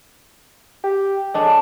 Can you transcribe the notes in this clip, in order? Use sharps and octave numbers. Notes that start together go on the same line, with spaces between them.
G4
G#3 C#4 D4 A4